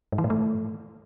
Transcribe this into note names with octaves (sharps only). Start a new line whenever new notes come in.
G#2
E3
A2
A3